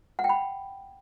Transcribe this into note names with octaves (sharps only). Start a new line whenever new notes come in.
F#5
G5
B5